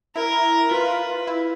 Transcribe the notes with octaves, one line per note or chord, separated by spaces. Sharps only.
E4 A#4
F4 B4
E4